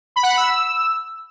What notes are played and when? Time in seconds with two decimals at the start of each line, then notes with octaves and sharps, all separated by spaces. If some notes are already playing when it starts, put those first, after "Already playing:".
0.16 B5
0.23 F#5
0.30 B5
0.37 E6